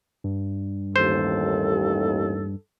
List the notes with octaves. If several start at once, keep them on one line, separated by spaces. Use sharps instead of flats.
G2
A1 D#2 A4 C5